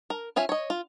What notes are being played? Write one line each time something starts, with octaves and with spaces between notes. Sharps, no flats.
A#4
C#4 F4 E5 G#5
C#5 D#5
F4